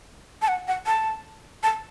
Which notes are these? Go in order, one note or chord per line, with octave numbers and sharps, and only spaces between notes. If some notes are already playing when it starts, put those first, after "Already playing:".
A5
F#5
F#5
A5
A5